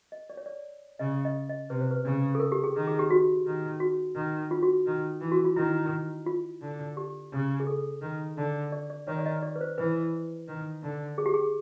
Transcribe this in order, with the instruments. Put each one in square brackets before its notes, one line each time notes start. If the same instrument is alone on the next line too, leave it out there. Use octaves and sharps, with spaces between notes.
[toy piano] D#5
D5
C#5
D5
[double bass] C#3 [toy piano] D#5
[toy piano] D#5
D#5
[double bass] C3 [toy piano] B4
[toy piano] C5
B4
[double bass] C#3
[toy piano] A4
A#4
G4
G#4
[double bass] D#3
[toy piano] G#4
G4
F#4
[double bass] D#3
[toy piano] F#4
[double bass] D#3
[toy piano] F4
F#4
[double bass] D#3
E3
[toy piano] F#4
F4
[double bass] D#3 [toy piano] E4
[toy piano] F4
[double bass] D3
[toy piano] G4
[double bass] C#3
[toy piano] G#4
A4
[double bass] D#3
D3
[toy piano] D5
D5
[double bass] D#3 [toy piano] C#5
[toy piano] D5
D#5
D5
B4
C5
[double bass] E3 [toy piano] B4
[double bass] D#3
D3
[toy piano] G#4
G4
G#4